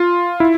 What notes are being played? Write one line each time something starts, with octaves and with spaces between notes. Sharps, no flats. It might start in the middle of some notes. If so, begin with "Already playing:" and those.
Already playing: F4
E4